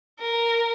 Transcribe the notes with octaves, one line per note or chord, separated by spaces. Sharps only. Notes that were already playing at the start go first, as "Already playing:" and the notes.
A#4